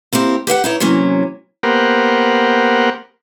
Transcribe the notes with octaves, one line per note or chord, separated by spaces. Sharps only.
A#3 C4 E4 G4 A#4
G4 B4 F5 F#5
D#4 E4 C#5
C3 E3 F#3 A#3 C#4
A#3 B3 G4 A#4 C5 F#5